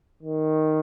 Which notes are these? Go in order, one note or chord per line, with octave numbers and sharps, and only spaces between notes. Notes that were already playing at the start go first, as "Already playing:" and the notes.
D#3